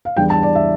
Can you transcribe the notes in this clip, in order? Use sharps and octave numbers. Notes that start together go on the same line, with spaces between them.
F5
E2 E3 G3 D4 G5
A5
D5
E5